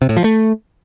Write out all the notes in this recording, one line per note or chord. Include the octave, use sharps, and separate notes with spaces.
C3
A2
F3
A3